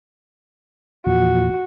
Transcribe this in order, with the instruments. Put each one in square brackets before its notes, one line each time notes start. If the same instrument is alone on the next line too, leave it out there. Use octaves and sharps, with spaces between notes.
[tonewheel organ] E2 A#2 F3 [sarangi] F#4